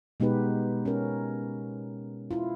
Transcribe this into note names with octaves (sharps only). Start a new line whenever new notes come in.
B2 G#3 B3 D#4 G4 B4
C#4 A#4
E4 F4